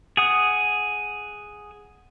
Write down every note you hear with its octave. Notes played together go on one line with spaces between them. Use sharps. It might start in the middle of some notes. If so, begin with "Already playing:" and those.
G#4 F#5 D#6